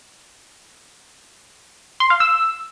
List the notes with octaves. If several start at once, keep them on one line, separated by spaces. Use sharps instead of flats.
C6
F5
E6